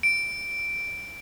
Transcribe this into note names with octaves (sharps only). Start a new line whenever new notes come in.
D7